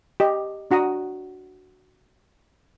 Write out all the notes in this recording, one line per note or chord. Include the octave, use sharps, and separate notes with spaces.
G4 D#5
D4 F#4 F#5 A#5 D#6